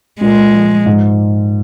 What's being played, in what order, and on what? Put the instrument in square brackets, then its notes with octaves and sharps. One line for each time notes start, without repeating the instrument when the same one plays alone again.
[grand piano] A#2 [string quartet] G#3
[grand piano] F3
G#2